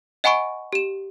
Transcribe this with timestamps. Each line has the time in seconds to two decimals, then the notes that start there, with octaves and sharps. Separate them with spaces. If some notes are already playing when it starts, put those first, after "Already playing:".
0.24 D#5 F#5 G#5 B5 C#6 D7
0.73 G4 E7